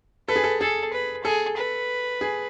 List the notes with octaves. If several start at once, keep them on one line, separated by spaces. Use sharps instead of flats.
A4 B4
G#4
A4
G#4 A4
B4
G#4 A4
B4
G#4